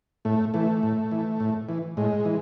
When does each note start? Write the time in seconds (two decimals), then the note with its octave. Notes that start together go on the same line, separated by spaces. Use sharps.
0.25 A2 A3
0.54 E3 A3
0.83 A2
1.11 E3
1.40 A2
1.69 E3
1.97 A2 G#3
2.25 E3